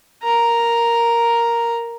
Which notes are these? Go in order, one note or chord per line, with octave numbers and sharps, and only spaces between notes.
A#4 A#5